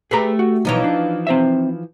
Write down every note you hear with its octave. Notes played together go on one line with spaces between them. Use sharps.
A3 G4 G#4 B4 A#5
F#4
B1 E3 F3 D#4 C#5
D4
C4 C5 E5